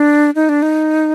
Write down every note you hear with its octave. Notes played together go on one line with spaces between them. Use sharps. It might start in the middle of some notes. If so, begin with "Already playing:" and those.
Already playing: D4
D#4
D4
D#4